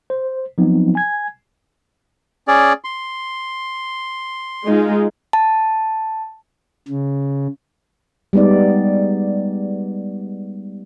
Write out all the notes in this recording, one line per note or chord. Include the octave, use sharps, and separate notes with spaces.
C5
F3 F#3 B3 C4 D#4
G#5 G#6
C#4 G#4 D5
C6
G#3 D#4 F4
A5
C#3
G3 G#3 B3 D#4 D5